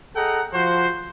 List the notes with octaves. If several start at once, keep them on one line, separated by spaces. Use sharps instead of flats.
G#4 A4 D#5 F#5 G5 A#5
F3 F#4 C5